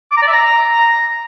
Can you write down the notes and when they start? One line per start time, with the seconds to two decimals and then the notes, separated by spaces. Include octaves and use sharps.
0.12 D6
0.17 A#5
0.22 D5
0.28 E5
0.33 A#5